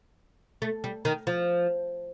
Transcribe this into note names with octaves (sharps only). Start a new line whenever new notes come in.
A3
G3
D#3
F3